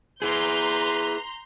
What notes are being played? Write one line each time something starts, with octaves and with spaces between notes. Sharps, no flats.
E4 G#4 B4 A#5 C6 G6